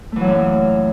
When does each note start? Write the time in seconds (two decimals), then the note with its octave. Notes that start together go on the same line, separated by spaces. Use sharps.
0.12 A3
0.16 E3
0.20 F#3
0.24 A#2
0.28 F#2